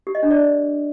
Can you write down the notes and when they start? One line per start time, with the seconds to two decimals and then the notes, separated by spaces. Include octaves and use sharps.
0.07 G4
0.15 D#5
0.23 D4
0.31 D5